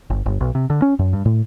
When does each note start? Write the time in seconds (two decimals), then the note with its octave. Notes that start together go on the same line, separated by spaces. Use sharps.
0.10 G1
0.26 G1
0.41 B1
0.55 C3
0.70 D3
0.82 C#4
0.99 F#2
1.13 G2
1.26 A2